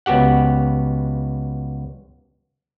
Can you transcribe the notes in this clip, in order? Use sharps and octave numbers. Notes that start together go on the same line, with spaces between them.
C#2 B3 F#4 G4 F#5